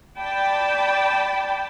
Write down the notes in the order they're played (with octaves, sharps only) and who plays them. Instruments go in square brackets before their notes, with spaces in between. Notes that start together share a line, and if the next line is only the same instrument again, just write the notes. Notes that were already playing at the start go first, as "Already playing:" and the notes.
[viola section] D5 G5 A5 B5